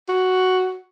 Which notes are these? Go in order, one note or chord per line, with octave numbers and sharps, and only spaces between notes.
F#4